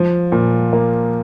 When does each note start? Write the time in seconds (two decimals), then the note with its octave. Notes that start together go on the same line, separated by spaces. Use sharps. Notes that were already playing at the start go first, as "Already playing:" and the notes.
Already playing: F3
0.32 A#2
0.73 A#3